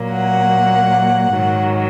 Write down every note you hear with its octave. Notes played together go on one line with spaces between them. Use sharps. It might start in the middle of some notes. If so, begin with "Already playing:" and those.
Already playing: A#2 F#3 A#3
F#5
G#2 D#3 F#3